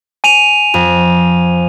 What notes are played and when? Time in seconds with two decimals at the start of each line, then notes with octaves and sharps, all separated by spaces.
0.24 G#5 D#7 F7
0.74 F2